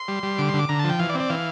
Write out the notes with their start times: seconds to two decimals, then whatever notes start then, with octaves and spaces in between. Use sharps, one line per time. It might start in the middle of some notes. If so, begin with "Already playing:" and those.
Already playing: C6
0.08 G3
0.23 G3
0.38 D3 D6
0.49 C6
0.54 D3
0.59 D6
0.69 D3 A#5
0.79 A5
0.84 F3 G5
0.99 E3 F5
1.09 D5
1.15 C4
1.20 D5
1.30 E3 F5